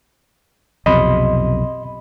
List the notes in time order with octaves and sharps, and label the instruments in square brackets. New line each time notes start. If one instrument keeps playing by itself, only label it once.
[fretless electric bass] B1 F2 C3 [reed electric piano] D#5 B5 C6